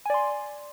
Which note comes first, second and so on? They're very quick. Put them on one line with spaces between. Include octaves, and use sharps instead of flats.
G#5 D5 C6